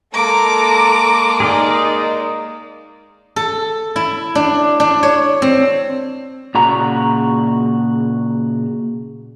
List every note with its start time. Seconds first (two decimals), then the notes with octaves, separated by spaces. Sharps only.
0.14 G#3 A#3 A4 A#5 D6
1.40 D#4 G#4 A#4 D5 D#5
3.36 A4
3.96 E4
4.35 D4
4.80 D4
5.03 C#5
5.42 C4
6.55 A#2 C#3 F#4 A#5